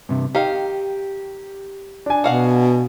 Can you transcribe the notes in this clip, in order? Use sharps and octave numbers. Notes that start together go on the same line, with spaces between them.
G2 C3
D#3 G4 F5
D4 G#5
B2 F#4 F5 F#5